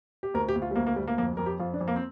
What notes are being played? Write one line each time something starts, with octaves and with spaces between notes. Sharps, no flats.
G4
D2 A#4
G4
D2
F4
G3
D2 A#3
A#3
D2 G3
A#3
F2 A#3
F2 A#4
G4
F2 F4
D4
F2
A#3
C4